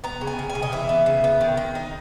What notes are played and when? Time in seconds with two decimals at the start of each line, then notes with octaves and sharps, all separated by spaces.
0.04 B3 A#5
0.21 C#3
0.27 G#5
0.39 C#3
0.50 G#5
0.55 C#3
0.62 D#5
0.72 E3 E5
0.89 B3
1.06 C#3
1.24 B3
1.41 D#3
1.57 D#3
1.75 D#4